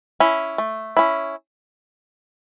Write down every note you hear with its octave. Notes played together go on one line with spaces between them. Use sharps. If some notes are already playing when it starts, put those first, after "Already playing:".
C#4 E4
A3
C#4 E4